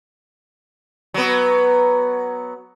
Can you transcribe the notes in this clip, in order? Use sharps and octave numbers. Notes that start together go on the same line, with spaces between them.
F#3 B3